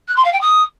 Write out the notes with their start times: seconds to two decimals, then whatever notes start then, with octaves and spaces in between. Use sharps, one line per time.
0.08 F#6
0.16 C6
0.25 F5
0.33 G5
0.41 D#6